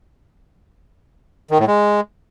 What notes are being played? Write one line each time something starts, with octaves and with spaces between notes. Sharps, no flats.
D#3
A2
G#3